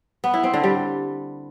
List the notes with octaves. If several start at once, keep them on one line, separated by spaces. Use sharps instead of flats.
B3
E4
C4
D3
G3